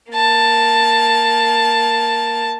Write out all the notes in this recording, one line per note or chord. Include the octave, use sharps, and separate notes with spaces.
A#3 A5